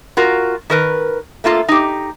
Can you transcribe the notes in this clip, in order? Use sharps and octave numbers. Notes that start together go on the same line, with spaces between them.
F4 F#4 A#4
D#3 A#4 B4
A3 A#3 F4 A4
D#4 G4